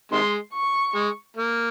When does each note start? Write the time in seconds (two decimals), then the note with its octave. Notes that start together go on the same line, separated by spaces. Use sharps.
0.12 C3 D#3 G#3 C6
0.54 C#6
0.95 G#3
1.37 A#3